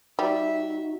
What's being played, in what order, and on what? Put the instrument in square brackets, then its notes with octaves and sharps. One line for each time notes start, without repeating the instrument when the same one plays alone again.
[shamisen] G3 [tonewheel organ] D#4 F#4 [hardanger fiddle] E5